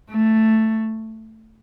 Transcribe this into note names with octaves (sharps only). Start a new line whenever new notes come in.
A3